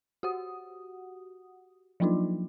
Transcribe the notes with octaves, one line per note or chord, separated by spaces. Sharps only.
F#4 G4 F#5 D#6
F3 F#3 A#3 D4 D#4 F4